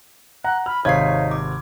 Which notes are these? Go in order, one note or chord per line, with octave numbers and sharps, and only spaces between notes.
F#5 A#5 F#6
B5 F6
G#1 C3 D#4 C#5 F5 G#6 C7
D6